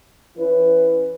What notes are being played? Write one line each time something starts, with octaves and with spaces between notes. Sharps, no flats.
E3 C#4 E4 B4